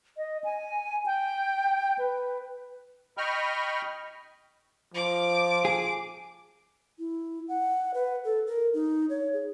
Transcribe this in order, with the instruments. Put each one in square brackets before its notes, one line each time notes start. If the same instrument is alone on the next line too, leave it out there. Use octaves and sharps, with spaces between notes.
[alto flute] D#5
G#5
G5
B4
[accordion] D#5 G5 B5 C#6 F6
[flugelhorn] F3 [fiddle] D6
[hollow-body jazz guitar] G#4
[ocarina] E4
F#5
B4
A4
A#4
D#4
C#5
G#4